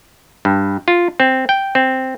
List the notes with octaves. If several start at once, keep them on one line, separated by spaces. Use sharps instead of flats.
G2
F4
C4
G5
C4